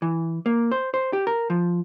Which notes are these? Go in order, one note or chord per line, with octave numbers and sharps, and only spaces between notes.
E3
A#3
C5
C5
G4
A#4
F3